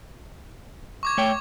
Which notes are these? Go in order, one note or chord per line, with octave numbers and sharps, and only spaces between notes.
C#6 D6 G#6
A3 C#5 G5